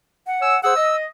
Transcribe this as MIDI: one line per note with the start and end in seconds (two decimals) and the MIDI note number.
0.27 0.60 78
0.41 0.55 73
0.41 0.55 80
0.41 0.55 88
0.63 0.74 68
0.63 0.74 72
0.63 0.74 78
0.63 0.96 88
0.76 1.06 75